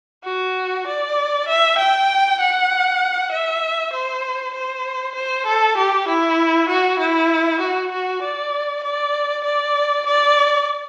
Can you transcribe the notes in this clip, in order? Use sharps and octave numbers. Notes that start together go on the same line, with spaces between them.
F#4
D5
E5
G5
F#5
E5
C5
C5
C5
A4
G4
E4
F#4
E4
F#4
F#4
D5
D5
D5
D5